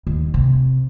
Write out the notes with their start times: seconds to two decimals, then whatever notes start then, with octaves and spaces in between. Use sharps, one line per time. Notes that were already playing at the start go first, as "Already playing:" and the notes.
0.07 D#2
0.34 C3